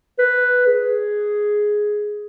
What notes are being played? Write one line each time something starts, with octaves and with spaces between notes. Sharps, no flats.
B4
G#4